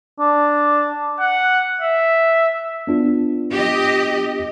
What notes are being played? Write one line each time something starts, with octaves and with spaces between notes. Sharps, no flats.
D4
F#5
E5
B3 D4 F4
G4 D#5